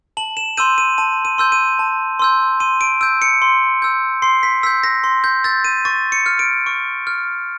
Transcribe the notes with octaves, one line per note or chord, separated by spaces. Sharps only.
A5 F#7
E7
C6 E6 G6 D#7
D#7
A5 D#7
D#7
C6 E6 G6
D#7
A5
C6 E6 G6
C6 D#7
D7
E6 G6 D7
C#7
C6
E6 G6
C6 C7
B6
E6 G6 B6
A#6
C6
G6
E6 G6 A6
D#7
C#6 A6
C#7
F6
D7
C#6
F6